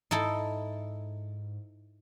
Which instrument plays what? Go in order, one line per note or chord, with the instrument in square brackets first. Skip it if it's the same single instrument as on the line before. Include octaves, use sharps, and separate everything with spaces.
[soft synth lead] G#2 [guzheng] D#4 E4 A4